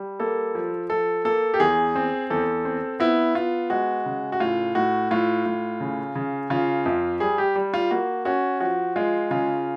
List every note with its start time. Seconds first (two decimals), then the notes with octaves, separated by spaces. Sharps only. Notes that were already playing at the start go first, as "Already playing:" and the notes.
Already playing: G3
0.20 A#3 A4
0.55 F3
0.89 F3 A4
1.25 A#3 A4
1.54 G4
1.60 E2 G#4
1.95 C4
2.30 E2 A4
2.65 C4
3.00 B3 E4
3.35 B3 F4
3.70 G#3 F#4
4.06 C#3
4.32 F#4
4.40 A2 F4
4.75 A2 F#4
5.11 A2 F4
5.46 A2
5.81 C#3
6.15 C#3
6.50 C#3 F4
6.86 F2
7.20 G3 G#4
7.38 G4
7.55 G3
7.74 F4
7.91 A#3 F#4
8.25 C#4 F#4
8.60 F3 F#4
8.96 G#3 F4
9.31 C#3 F4